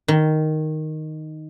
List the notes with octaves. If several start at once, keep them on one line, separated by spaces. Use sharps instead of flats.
D#3